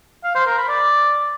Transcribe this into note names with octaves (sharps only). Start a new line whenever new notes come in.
F5
C5
A#4
B5
D5